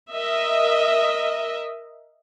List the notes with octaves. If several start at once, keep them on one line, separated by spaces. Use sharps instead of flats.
A#4 D#5 E5